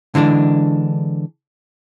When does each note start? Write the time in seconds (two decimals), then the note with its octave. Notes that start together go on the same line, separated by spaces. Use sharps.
0.15 D3 E3 G#3 D4